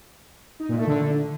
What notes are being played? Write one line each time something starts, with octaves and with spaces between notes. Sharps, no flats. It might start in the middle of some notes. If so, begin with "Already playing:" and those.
D#4
A#2
A3
D3